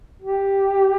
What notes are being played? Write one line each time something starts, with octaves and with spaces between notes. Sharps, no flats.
G4